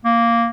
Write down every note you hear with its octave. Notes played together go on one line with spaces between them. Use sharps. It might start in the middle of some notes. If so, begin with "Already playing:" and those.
A#3